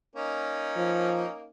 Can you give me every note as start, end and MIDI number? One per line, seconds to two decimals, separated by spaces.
0.16 1.50 58
0.16 1.50 61
0.16 1.50 63
0.76 1.23 53